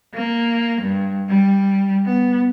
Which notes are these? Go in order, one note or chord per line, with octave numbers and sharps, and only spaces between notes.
A#3
G2
G3
B3